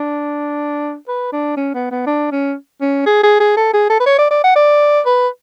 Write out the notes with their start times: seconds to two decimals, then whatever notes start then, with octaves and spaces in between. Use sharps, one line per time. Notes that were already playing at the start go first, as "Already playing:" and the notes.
Already playing: D4
1.08 B4
1.32 D4
1.57 C#4
1.74 B3
1.90 B3
2.06 D4
2.32 C#4
2.81 C#4
3.06 G#4
3.23 G#4
3.40 G#4
3.56 A4
3.74 G#4
3.90 A4
4.00 B4
4.06 C#5
4.18 D5
4.31 D5
4.44 F#5
4.56 D5
5.06 B4